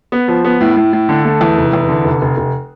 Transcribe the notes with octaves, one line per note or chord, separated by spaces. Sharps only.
B3
F3
B3
A2
A2
A2
D3
A3
E2
F1
E2
D3
F1
F1
F1